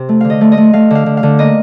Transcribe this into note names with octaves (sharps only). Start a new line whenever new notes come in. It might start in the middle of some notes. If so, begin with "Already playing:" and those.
Already playing: C3
A3
D3 F5
D#5
A3
D#5
A3
A3 F5
D3 F5
D3
F5
D3
A#3 D#5